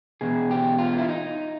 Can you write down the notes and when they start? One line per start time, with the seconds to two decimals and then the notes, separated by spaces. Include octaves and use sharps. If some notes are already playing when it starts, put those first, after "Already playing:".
0.21 E2 B2 G#4
0.51 G4
0.79 F4
0.98 E4
1.09 D#4